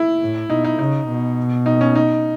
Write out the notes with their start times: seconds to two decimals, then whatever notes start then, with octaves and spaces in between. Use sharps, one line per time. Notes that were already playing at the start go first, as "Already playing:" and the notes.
Already playing: E4
0.20 A2
0.50 B2 D#4
0.64 D#4
0.79 C#3 D#4
1.08 B2
1.66 D#4
1.81 C#4
1.95 D#4